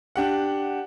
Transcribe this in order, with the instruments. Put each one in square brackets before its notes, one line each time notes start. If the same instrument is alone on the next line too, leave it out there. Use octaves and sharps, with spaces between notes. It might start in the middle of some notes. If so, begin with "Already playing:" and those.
[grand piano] D4 G4 F#5